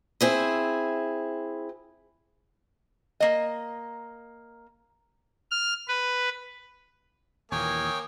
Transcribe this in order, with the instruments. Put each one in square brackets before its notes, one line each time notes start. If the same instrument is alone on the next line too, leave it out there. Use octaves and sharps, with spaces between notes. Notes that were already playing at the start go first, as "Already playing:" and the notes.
[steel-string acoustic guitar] C4 E4 G#4
[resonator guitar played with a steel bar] A#3 D#5
[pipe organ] F6
B4
[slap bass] D#2 A#2 E3 [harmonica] A#3 G#5 [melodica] C#5 G5 [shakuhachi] D#6